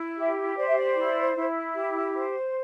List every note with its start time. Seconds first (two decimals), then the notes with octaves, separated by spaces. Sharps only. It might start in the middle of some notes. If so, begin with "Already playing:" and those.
Already playing: E4
0.16 G4 E5
0.56 C5 D5
0.67 E5
0.77 D5
0.96 E4
1.35 E4
1.76 G4
2.15 C5